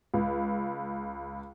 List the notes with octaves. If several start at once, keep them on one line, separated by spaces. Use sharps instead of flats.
C#2